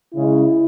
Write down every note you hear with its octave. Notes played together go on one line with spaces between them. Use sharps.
C#3 G#3 E4